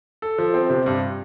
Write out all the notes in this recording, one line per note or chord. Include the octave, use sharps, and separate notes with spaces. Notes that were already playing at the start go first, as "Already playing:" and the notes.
A4
F3
C4
C3
G2